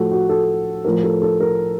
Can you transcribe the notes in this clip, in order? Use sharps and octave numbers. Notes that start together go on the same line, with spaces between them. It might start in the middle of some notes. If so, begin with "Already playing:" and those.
Already playing: A2 F3 F#4 A4
F#4
A4
A2 F3 A#4
A4
A4
A#4